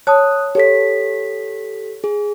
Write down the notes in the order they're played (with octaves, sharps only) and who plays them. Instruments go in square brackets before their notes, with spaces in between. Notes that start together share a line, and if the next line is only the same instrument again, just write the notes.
[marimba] C#5 A5 [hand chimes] D#6 F#6
[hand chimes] G4 A4 B6 [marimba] C#5
[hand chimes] G#4